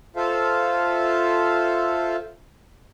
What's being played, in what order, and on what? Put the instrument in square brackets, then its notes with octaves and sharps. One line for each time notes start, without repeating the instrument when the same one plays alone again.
[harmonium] F4 A4 C5 E5 F5